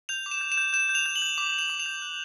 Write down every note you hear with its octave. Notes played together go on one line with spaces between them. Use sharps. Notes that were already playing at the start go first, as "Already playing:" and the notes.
G6 F7
D6
E7
G6
E7
G6
G6 E7
G6
F7
G6
F#7
G6
D6
D6 F7
D6
F7
G6
F#6